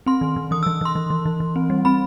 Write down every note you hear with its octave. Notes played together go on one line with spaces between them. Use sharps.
C4 C6
D#3
D#3
E3 D#6
E6
E3
E3 C6
E3
E3
E3
E3
C4
G3
C4 B5